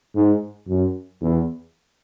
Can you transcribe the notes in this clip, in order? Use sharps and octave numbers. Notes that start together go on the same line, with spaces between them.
G#2
F#2
E2